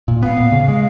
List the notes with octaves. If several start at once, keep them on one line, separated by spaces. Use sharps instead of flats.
A#2
B3 F5
A#2
C#3
G#3